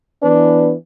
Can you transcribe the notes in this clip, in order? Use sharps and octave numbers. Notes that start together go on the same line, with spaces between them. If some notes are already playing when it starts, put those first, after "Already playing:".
E3 B3 D4 B4